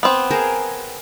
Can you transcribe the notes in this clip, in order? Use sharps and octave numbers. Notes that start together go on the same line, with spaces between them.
B3 C4
G#4 A#4 C5